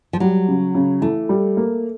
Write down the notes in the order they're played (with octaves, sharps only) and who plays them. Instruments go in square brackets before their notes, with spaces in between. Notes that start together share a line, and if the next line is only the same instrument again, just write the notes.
[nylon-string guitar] F3
[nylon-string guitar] F#3 [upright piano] G3
[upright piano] C#3
C#3
[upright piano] E3 [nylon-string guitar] A3
[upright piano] G3
A#3